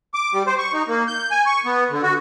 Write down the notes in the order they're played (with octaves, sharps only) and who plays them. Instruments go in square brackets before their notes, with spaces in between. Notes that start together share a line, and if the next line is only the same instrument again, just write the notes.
[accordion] D6
G3
C5
C#6
D#4
A#3
G6
G#5
C#6
B3
D3
F#4